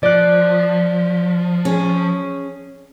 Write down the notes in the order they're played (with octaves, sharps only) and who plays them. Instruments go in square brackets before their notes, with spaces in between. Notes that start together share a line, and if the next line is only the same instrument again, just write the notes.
[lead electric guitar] F3 [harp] D5 F#6
[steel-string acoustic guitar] C#4 G#4